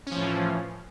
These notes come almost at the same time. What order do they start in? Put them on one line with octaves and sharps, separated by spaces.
C#4 F3 A2 E3